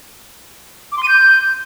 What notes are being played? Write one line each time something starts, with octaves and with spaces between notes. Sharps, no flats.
D6
C6
D#7
G6